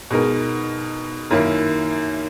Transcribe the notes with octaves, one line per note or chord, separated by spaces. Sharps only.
B2 G#3 D#4 A#4
F#2 D#3 A#3 E4